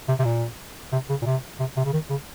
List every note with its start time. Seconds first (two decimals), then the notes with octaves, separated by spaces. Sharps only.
0.08 C3
0.19 C3
0.24 A#2
0.92 C3
1.10 C#3
1.22 A#2
1.25 C3
1.60 C3
1.77 C3
1.85 C#3
1.93 D#3
2.10 C#3